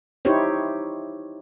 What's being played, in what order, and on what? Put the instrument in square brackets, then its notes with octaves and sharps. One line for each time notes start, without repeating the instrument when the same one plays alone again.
[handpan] D#4 E4 G4 C5 C#5